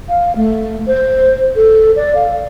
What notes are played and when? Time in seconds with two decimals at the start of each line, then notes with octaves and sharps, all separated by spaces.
0.09 F5
0.36 A3
0.87 C5
1.56 A4
1.96 D5
2.15 F5